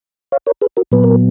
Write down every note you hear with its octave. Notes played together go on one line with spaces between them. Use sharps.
C#5 F5
A#4 C#5
G#4 B4
F#4 A#4
A#2 F#3 B3 B4
A#4